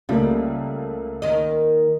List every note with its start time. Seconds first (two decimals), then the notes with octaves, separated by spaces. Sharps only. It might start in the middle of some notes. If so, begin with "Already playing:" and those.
0.09 C#2 G3 A3 A#3
1.22 D#2 D#3 D#5